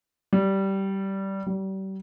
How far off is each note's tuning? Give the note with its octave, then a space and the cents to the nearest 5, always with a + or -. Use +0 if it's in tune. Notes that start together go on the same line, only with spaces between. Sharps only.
G3 -15
G3 -35